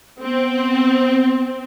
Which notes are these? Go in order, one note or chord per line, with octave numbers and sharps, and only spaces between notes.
B3 C4